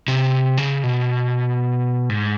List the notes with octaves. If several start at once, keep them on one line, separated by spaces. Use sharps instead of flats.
C3
C#3
B2
G#2